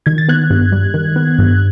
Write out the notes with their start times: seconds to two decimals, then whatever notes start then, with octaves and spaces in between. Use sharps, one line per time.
0.06 D#3 G#6
0.18 A6
0.28 B3 F#6 G#6
0.50 G2
0.72 G3
0.94 D#3
1.16 B3
1.38 G2